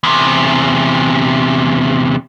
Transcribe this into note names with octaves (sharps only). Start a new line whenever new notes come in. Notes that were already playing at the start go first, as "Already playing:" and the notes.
E2 C3